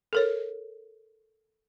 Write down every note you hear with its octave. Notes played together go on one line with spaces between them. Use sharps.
A4 A#4 C#5